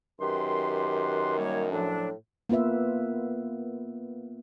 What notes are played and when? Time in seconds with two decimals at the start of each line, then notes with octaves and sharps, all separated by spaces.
0.20 F#2 D#3 G4 B4 C6
1.38 G3 A#3 C#5
1.71 A2 F3 F#3 D4
2.49 A#3 B3 F4 B4 E5